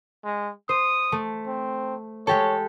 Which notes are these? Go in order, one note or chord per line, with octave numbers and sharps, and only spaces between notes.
G#3
C5 D#6
A3
C4
G#3 G4 A4 C#5